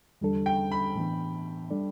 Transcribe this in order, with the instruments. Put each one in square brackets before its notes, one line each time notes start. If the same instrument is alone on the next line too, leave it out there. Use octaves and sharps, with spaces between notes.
[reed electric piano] E2 D3 G3 D4 A4
[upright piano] G5
B5
[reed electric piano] A2 E3 B3 D4
G3 D4 A4 D5